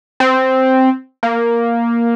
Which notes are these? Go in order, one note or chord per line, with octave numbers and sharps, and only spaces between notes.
C4
A#3